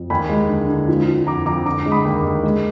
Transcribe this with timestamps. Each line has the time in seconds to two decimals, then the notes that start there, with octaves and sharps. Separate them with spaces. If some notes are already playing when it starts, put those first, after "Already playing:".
Already playing: F2
0.10 D#2 G#5 B5
0.29 G#3
0.49 D3
0.69 D3
0.88 F3
1.08 F3
1.27 F2 A#5 D6
1.46 F2 A#5 D6
1.66 D3 A#5 D6
1.86 G#3
1.92 B5 D#6
2.05 D#2
2.25 D#2
2.43 G#3